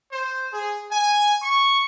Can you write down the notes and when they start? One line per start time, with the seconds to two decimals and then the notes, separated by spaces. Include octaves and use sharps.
0.11 C5
0.52 G#4
0.90 G#5
1.42 C#6